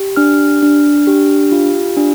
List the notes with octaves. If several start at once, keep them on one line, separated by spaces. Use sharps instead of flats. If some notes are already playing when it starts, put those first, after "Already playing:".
Already playing: G4
D4 F6
D4
G4
F4
D4